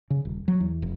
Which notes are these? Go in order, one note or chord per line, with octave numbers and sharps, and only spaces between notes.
C#3
D#1
F#3
E2
F1